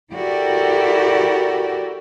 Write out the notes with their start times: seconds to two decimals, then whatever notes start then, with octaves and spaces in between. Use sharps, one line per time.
0.13 E4 F#4 G4 A4 A#4 D5